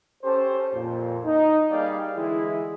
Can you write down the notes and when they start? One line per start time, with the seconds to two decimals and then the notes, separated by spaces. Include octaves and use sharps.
0.23 C#4 G4 A4 C5
0.73 F2 A#2
1.25 D#4
1.71 G3 A#3 G#4 D5 F5 G5
2.15 D3 E3 G#3 E4 G#4